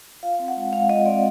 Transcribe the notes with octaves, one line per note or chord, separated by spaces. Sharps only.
F4 F5
C4
F#5
G#3
G#3 F5
F4 D#5
C4 D5